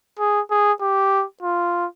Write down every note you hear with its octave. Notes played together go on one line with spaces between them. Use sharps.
G#4
G#4
G4
F4